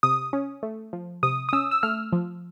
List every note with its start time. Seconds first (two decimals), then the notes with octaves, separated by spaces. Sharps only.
0.03 C3 D#6
0.33 C#4
0.63 A3
0.93 F3
1.23 C3 D#6
1.49 D#6
1.53 C#4 E6
1.71 E6
1.83 A3 F6
2.12 F3